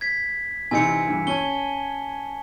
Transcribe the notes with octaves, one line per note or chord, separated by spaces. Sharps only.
G#6 B6
C3 E3 D#4 G#5 C#7
G2 E3
C#4 A5 G7